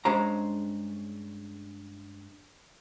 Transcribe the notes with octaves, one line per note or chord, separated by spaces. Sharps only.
G2 G#3 C#4 C5 A#5